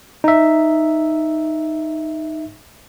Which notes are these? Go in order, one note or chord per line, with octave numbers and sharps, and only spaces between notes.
D#4 E5